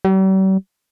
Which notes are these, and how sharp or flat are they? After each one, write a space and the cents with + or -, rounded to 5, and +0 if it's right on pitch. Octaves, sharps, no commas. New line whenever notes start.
G3 -45